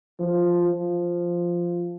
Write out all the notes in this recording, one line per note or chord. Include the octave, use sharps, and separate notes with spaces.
F3
F3